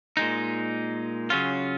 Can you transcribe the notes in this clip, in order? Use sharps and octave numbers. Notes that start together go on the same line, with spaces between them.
A#2 G#3 D#4
C#3 F#3 C#4 F4